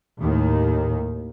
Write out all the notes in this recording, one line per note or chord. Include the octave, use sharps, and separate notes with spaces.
D#2 A2 D#3